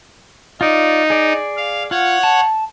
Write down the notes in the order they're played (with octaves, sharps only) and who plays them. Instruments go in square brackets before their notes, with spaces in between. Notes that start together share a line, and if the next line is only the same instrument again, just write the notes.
[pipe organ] D#4 [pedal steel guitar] F4 D5
[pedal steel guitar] G#4 D5
[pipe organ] F5
[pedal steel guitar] F4 [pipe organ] C#5 F#5
[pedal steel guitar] A5